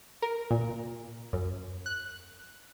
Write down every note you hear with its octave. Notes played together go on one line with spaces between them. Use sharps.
A#4
A#2
F#2
F#6